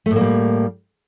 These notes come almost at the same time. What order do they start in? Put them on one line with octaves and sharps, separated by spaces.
A3 A2 A#3 G3